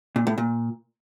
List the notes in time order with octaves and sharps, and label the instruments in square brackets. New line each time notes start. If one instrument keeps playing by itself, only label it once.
[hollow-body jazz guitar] A#2
A2
A#2